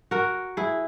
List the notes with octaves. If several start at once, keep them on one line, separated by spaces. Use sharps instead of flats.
F#4 A#4
E4 G#4